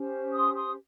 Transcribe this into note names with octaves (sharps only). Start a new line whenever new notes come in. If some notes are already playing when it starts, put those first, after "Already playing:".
Already playing: C#4 G4 C5
C6 D#6
C6 D#6